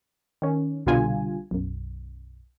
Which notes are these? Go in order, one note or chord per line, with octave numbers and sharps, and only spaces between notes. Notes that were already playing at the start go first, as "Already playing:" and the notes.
D#3 C#4
C2 B2 D3 G3 F4 G#5
B1 F#2